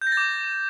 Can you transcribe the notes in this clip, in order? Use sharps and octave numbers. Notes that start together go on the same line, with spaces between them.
G6
A#6
A6
D6